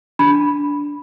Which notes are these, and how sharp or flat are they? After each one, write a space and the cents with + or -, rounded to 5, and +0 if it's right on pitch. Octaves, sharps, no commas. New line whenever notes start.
D4 -15 B5 -5